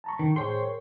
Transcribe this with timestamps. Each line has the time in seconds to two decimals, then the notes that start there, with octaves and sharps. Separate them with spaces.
0.04 A5 A#5 C#6
0.19 D#3
0.36 A2 G#4 C5 C#5 G5 C6
0.61 A#4